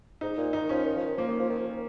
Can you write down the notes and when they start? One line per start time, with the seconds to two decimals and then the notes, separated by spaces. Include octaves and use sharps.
0.21 G#2 D#4
0.37 A#2
0.53 D#3 D#4
0.69 F3 C#4
0.85 D#3
0.96 F3
1.07 D#3
1.17 F3 A#3
1.28 D#3
1.39 F3
1.50 D#3
1.59 F3
1.70 D#3